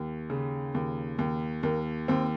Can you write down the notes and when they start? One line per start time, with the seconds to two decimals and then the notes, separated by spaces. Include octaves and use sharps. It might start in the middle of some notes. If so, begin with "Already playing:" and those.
Already playing: D#2
0.30 C#3
0.74 D#2
1.19 D#2
1.63 D#2 A#3
2.08 D#2 C4